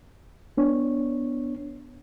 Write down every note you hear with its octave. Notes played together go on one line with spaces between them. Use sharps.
B3 D4 C#5